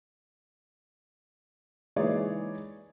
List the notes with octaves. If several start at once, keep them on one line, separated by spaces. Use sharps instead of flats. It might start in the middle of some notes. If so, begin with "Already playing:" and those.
E3 G#3 D#4 G#4 C#5 D5